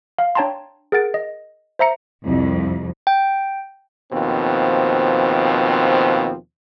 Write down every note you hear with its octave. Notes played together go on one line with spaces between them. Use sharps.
F5
D4 C#5 G5 A5 A#5 C6
G#4 A#4 F#5 A6 D7
D#5
C5 E5 A#5 C#7
C2 F2
G5
D#2 B2 F3 C4